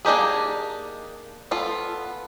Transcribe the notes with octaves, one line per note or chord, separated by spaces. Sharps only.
A#3 D4 D#4 G4 G#4
B3 F4 A4